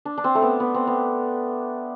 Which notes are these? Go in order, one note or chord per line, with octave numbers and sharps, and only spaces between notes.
D4
D4
C4
A3
B3
B3
C4
B3